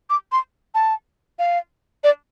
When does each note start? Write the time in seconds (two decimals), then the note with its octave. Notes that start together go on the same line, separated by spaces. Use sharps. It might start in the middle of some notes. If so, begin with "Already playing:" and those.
0.10 D6
0.32 C6
0.74 A5
1.39 F5
2.04 D5